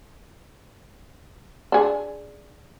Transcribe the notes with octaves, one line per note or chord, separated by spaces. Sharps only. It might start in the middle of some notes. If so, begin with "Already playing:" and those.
D4 G#4